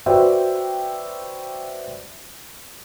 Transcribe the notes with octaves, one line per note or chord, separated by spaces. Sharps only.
F#4 B4 C5 D5 E5 G5